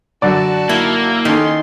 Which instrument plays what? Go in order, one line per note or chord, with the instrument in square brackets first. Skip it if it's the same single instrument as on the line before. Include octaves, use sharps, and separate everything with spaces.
[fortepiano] F#2 D3 D5 [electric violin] F#4 A5
[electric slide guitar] A#3 [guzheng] E4
[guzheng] D#3 [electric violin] C#4 C6 [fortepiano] D#4 A4